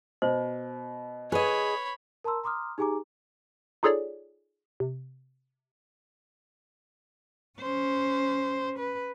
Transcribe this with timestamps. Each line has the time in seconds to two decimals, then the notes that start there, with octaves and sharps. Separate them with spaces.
0.22 B2 C5
1.32 G#4 B4 C#5 D#5 B5
2.24 A#4 A5 A#5 C6 E6
2.44 A#5 C6 D6 D#6 F6
2.78 D#4 G4 G#4 G#5 A#5 D6
3.83 D#4 F4 G#4 A4 C#5 D5
4.80 C3
7.59 C#4 C5
8.79 B4